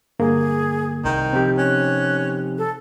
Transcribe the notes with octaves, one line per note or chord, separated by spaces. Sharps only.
G2 D3 A#3 G#4
C2 D#3 G6
C3 F3 C4 D#4 G4
C#4 F#6
A4